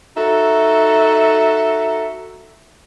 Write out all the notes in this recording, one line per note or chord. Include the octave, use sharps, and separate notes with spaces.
D#4 F#4 A4 E5